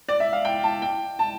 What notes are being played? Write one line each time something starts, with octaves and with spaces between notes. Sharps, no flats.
D5
E5
F5
G5
A5
G5
A5